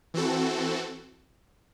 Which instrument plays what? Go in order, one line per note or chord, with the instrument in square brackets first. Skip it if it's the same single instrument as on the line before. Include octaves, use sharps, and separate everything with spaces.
[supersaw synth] E3 C4 F#4 A4